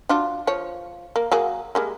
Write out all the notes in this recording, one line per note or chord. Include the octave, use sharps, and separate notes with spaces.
D4 F4 F#4
F3 C#5
A#3
F#3 A#3 G#4
G3 G#3 A#3